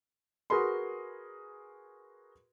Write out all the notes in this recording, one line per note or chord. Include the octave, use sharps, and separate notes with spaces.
F#4 G#4 A#4 B4 B5 C6